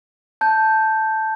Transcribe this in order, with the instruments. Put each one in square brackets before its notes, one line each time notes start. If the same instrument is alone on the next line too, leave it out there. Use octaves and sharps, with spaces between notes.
[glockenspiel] A5 G6